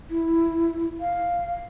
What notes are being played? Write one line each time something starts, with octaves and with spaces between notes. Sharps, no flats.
E4
F5